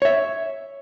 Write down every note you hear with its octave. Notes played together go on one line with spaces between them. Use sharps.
C#5 E5